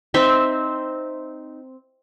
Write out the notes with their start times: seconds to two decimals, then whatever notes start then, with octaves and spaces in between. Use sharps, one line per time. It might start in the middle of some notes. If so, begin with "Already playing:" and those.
0.14 C4 D#4 E5